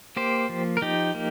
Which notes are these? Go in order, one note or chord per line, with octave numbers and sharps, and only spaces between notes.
A#3 G4 C5
F3
A#4
F3 D#4 G4
A#3